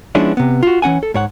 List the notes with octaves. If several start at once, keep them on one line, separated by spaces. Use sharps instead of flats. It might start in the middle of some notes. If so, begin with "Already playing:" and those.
F3 G#3 B3 C#4 D4 E4
C3 B3
F4 F#4
E3 C#4 F#5 G#5
A4
G#2 C#5 F#5